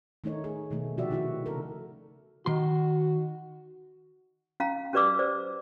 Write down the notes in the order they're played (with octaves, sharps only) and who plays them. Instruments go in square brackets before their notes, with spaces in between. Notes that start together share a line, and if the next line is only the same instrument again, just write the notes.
[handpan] D#3 A3 D#4 C#5
G#4
B2 D#3 A3
C3 F3 F#4 G4 D5 E5
D#3 E4 F#4
C#3 A4 A#4
[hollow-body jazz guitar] D#3 C6 [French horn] F#4
[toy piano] C#4 F5 A#5
C#4 G4 B4 D5 D6 E6
C5 D5